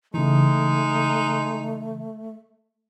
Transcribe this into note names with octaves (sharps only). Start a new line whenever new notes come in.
C#3 E3 G#3 A3 D#4